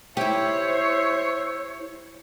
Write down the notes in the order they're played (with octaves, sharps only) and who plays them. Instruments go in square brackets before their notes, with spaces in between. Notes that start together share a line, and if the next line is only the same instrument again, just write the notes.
[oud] E4 G4 [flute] C5 [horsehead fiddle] C#5 [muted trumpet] E5